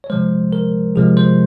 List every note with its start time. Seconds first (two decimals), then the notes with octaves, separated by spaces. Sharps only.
0.04 C#5
0.10 C3 F3 G#3 C5
0.53 A#4
0.96 C3 F3 G#3 G#4
1.17 C5